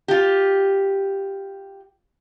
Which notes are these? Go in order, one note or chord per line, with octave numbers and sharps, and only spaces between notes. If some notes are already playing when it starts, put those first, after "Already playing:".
F4 G4